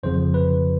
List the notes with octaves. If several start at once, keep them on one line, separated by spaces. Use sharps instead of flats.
G1 F2 C#3 F3 C5
B4